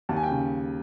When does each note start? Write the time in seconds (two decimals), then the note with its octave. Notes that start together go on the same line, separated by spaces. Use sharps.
0.09 D#2 A5
0.16 G#5
0.23 G5
0.30 C#3